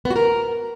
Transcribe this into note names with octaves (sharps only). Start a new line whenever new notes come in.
B3
F#4
A#4